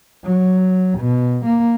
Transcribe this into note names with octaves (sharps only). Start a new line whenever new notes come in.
F#3
B2
A#3